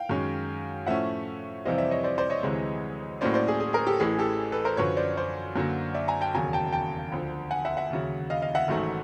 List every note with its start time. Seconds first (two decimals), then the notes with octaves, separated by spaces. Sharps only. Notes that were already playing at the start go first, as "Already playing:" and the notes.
Already playing: F5 G5
0.09 F#2 D#3 G#3 C#4
0.86 A2 F3 A3 C#4 E5 F#5
1.65 F2 C3 E3 G3 C4 D#5 F5
1.78 D5 E5
1.91 C#5 D#5
2.04 C5 D5
2.18 C5 D5
2.30 C#5 D#5
2.43 D2 C3 E3 G#3
3.21 A2 F#3 A#3 C#4 C5 D5
3.34 C5 D5
3.48 G#4
3.60 G#4
3.73 G#4 A#4
3.87 G4 A4
4.00 A1 A2 E3 G#4
4.19 G4 A4
4.52 A4 B4
4.65 A#4 C5
4.77 F#2 D3 F3 B4 C#5
4.97 C5 D5
5.17 C5 D5
5.56 F#2 D3 F#3 A#3
5.94 D5 E5
6.08 G#5 A#5
6.21 G5 A5
6.35 E1 D#2 C#3 F#3 G#5 A#5
6.53 G5 A5
6.73 G5 A5
7.12 D2 D3 F3
7.51 F#5 G#5
7.65 E5 F#5
7.77 E5 F#5
7.90 D#2 C#3 F#3
8.30 D#5 F5
8.42 D#5 F5
8.55 E5 F#5
8.68 A1 G#2 D#3 F#3 A3